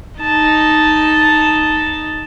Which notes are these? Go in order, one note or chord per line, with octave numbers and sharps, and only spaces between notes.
D#4 A5